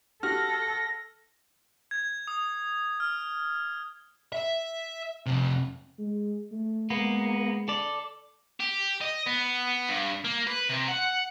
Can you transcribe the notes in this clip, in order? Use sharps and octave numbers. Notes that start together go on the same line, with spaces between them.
F#4 G4 A4 F6 A#6
G#6
D#6
F6
E5
F2 C3
G#3
A3
G#3 A#3 B3
A4 D5
G4
D#5
B3
G2
A#3
B4
C3
F#5